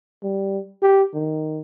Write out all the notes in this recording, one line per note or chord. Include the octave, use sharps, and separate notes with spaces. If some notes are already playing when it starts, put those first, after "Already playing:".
G3
G4
D#3